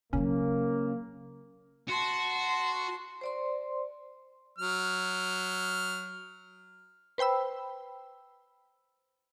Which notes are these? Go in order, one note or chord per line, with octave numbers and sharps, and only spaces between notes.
C#3 F#3 A#3 C#4
F#4 A5 C6
C5 D5 C6
F#3 F6
B4 C5 G5 B5 E6